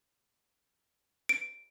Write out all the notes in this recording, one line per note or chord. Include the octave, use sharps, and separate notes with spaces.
D7